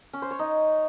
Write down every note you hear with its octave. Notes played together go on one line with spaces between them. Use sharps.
C#4
C5
C#5
D#4